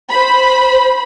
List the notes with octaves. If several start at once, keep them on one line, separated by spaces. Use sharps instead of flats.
C5 B5